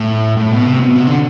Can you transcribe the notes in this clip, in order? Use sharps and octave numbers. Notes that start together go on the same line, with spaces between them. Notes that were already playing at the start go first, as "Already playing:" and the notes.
Already playing: A2
A2
B2
C3
B2
C3
D3